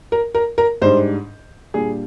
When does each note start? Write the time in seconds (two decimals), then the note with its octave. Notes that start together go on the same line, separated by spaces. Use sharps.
0.12 A#4
0.35 A#4
0.58 A#4
0.82 G#2 G3 D4 C5
1.74 A#2 G3 D4 G#4